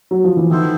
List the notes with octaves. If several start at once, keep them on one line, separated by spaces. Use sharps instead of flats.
F#3
F3
E3
D#3 B3 E4 A4 C5